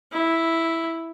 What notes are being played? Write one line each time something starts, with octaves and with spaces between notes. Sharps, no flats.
E4